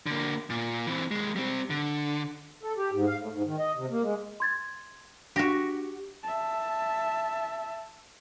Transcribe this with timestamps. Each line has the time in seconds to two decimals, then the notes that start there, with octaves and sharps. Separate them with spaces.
0.06 D3 A#3
0.50 A#2
0.87 E3 C4
1.11 D#2 G#3
1.36 G3 C4
1.70 D3
2.63 A4
2.77 G4
2.92 G#2
3.07 F5
3.19 A2
3.33 G#2
3.46 D#3
3.59 D#5
3.76 C3
3.91 A#3
4.03 G#3
4.40 C6 G#6 A6
5.36 D4 F#4 G4 A#6
6.23 E5 A5